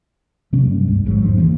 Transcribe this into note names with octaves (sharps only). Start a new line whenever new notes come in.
C3 F#3 A#3 C#4
G2
C#2 G2
A#1 G#2 E3 F#3
F1 G#2 F3 D4
D2 E3 A#3